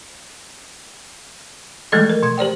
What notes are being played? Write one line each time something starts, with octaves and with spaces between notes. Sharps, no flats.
E3 F3 G#3 A3 A4 D#5
A#4
B2 G#6
G4 C5 D5 G5